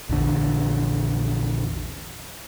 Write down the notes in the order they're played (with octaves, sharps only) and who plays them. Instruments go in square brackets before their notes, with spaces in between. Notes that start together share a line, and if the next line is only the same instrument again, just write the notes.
[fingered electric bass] A#1 E2 D3